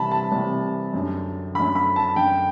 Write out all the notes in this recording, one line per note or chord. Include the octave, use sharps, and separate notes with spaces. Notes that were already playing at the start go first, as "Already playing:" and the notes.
Already playing: C2 C3 E3 A5 B5
A5
C2 C3 E3
F#2 D3
F#2 D3 B5
B5
A5
F#2 D3 G5